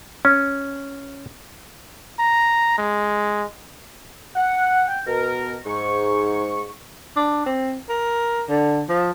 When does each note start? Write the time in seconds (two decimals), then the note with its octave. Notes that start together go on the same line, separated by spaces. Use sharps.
0.25 C#4
2.19 A#5
2.78 G#3
4.36 F#5
4.88 G5
5.07 B2 A#4
5.66 G#2 C#6
7.16 D4
7.46 C4
7.89 A#4
8.49 D3
8.89 F3